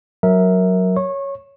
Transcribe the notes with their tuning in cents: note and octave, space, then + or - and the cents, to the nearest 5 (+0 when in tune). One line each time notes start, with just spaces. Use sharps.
F#3 -5 A#4 +0 E5 -20
C#5 +0 C#6 -25